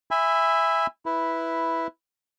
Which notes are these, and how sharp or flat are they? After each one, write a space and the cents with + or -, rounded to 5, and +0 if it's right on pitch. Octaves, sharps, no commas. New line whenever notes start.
E5 +0 G#5 -20 B5 +15
E4 +0 B4 +0